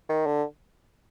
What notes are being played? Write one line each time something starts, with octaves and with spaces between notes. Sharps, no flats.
D#3
D3